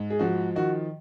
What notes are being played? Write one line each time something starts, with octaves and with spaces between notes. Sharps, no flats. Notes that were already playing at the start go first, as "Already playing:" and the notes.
Already playing: G#2
G#4
F3 F#4
D#3 F#4